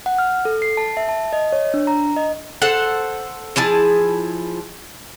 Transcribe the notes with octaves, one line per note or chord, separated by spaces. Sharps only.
F#5
F6
A4
C7
A5
E5
A5
D#5
C#5
D4
A#5
D#5
A4 C5 F#5
F3 E4 G#4 A5